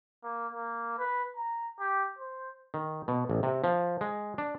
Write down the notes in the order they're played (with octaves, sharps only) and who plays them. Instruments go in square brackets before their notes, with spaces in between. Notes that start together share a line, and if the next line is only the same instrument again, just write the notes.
[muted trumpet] A#3
A#3
B4
A#5
G4
C5
[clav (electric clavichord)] D#3
B2
A1
C3
F3
G#3
D4